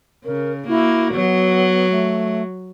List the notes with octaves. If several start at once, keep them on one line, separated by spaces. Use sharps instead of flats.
C#3 A#4
A#3 E4 F#4
F#3 B3
A3